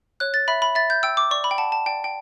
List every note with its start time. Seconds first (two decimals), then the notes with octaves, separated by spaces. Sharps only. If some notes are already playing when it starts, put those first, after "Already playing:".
0.20 C#5 F#6
0.34 A6
0.48 E5 B5
0.62 B5
0.75 E5 A6
0.90 G6
1.03 G5 E6
1.17 D6
1.31 D5 C#6
1.44 B5
1.51 G5
1.58 F#5 A5
1.72 A5
1.86 D5 G5
2.04 G5